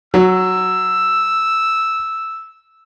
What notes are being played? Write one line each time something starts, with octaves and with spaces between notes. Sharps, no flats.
F#3 E6